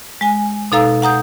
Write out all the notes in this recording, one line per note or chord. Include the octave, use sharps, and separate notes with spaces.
G#3 G#5
B2 D#4 A4 F5 A#5 E6
F#5 A#5 D#6 G6